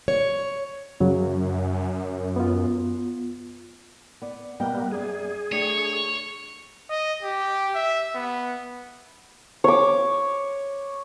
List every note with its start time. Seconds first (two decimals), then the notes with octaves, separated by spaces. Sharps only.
0.08 C#5
1.00 F#2 C#3 F#3
2.36 B3 F4
4.22 B3 D5
4.60 B2 G3 A#3 B3 D#5 G5
4.92 F#2 G#4 D5
5.52 A3 D4 G4 C#5
6.90 D#5
7.22 G4
7.75 E5
8.15 B3
9.64 C#5 D6